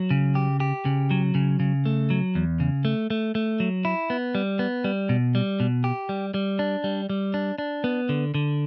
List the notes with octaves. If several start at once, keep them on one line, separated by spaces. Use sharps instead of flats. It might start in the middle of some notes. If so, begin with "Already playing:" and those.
Already playing: F#3
C#3
G4
G4
C#3
F#3
C#3
C#3
A3
F#3
E2
C#3
A3
A3
A3
F#3
E4
B3
G3
B3
G3
B2
G3
B2
G4
G3
G3
D4
G3
G3
D4
D4
B3
D3
D3